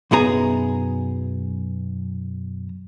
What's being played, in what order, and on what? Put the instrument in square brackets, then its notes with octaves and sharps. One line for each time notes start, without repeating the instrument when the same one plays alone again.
[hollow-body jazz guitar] B1 F#2 B3 G#4 A#5